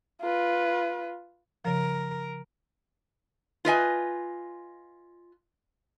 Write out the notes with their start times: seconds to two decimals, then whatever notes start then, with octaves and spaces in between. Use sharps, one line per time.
0.21 F4 B4
1.65 C#3 F3 A#4
3.65 F4 B4 D#5 G#5